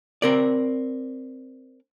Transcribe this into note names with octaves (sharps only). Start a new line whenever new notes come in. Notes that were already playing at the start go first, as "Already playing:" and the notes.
C4 A#4 D5